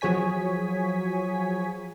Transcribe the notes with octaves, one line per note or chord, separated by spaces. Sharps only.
F3 F#3 G#4 C#5 G#5 B6